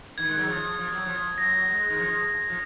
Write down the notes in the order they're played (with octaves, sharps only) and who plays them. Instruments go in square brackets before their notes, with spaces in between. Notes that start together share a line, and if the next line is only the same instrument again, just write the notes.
[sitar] D#3 [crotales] G#6
[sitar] G#3
F#3
F3
F3
F#3
F3
[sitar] F#3 [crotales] A#6
[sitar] G#3 [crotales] A#6
[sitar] D#3
F3
F3